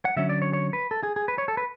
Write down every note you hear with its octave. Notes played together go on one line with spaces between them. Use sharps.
F#5
D3 F#3 C#4 E5
D5
C#5
C#5
B4
A4
G#4
G#4
B4
C#5
A4
B4